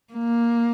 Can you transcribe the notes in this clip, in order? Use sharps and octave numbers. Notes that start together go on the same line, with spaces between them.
A#3